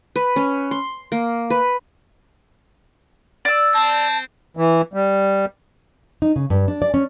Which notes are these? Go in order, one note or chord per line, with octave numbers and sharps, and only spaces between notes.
B4
C#4
C6
A#3
B4
D5 E6
C4 A5
E3
G3
D#4
C#3
G2
D4
D5
C#4